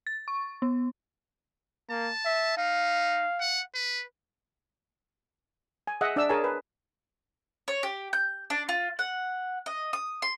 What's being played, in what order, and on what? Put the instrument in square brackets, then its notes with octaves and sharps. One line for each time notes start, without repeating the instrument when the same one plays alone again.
[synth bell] A6
C#6
B3
[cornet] A#3 [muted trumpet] A5
[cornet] E5
[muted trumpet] D#4 [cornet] F5
[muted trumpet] F#5
B4
[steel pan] G#5
G#4 D#5 E5 F#5
D4 D5 E5 E6
G#4 A#4 C#5 G#5 A5
B4
[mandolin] C#5
G4
G6
D4
F4
F#5
D#5
D#6
C6